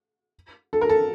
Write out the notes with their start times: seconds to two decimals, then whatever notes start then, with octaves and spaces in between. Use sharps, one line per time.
0.73 A4
0.81 A#4
0.90 A4